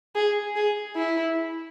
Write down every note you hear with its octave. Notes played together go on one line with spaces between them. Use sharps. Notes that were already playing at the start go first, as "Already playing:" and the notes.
G#4
G#4
E4